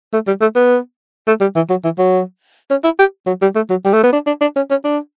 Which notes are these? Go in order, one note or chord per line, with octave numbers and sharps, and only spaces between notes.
A3
G3
A3
B3
A3
G3
E3
F#3
E3
F#3
C#4
E4
G4
F#3
G3
A3
F#3
G3
A3
B3
D4
D4
D4
C#4
C#4
D4